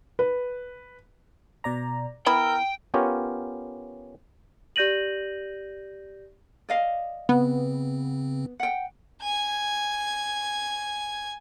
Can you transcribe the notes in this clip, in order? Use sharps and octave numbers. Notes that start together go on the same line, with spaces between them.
B4
B2 D5 A#5
B3 E4 A#4 G5 B5 E6
B3 C#4 F4 G4 A#4 C#5
G4 D5 G6 A#6 D#7 F#7
D5 D#5 F5
C#3 B3 C4
F#5 G5
G#5 G#6